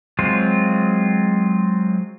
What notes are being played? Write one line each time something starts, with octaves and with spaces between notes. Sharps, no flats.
F#3 G#3 C4 F4